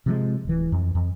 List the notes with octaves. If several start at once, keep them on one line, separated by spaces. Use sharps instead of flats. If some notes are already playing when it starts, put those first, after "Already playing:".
C3 F3 G#3
D1 E3
F2
F2